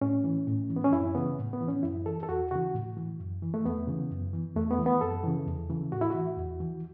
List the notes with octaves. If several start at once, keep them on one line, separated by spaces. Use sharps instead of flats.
A2 C#4
E3
A2
E3
B3
C#4
F#2 E4
C#3 E3 B3
A2
B3
E3
C#4
F#2 E4
E3 A4
A4
E2 F#4
C#3 E3 F#4
A2
E3
F#2
E3
A3
E2 B3
C#3 E3
F#2
E3
E2 A3
B3
E3
B3
F#2 A4
C#3 E3
E2
C#3 E3
A2 F#4
E4
E3 F#4
E2
E3